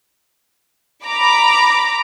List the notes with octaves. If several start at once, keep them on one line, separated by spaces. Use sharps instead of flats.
A#5 B5 D6